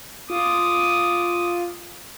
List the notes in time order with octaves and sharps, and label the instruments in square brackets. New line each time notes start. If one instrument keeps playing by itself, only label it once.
[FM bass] F4 [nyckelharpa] D6 D#6